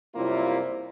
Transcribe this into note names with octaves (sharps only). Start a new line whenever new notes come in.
F#2 C3 G3 A#3 E4 F4